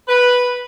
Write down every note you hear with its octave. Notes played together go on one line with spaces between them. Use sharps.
B4